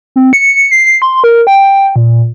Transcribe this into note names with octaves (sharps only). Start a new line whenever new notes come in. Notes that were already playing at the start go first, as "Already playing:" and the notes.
C4
C#7
C7
C6
A#4
G5
A#2